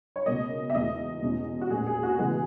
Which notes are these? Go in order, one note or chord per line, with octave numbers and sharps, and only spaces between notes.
C#5
C#2 B2 A#3 D#5
E5
E2 B2 G#3 D#5
E2 B2 G#3 C#4
F#4
A#2 G#3 C#4 G#4
G#4
F#4
C#3 E3 G#3 B3 G#4